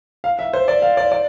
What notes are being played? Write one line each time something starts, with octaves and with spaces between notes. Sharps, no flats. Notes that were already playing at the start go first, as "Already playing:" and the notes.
F5
E5
C5
D5
F5
D5
D5